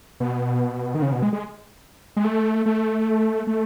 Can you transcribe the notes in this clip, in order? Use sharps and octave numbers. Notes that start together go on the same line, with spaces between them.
B2
D#3
C#3
B2
G#3
G#3
G#3
A3
A3
A3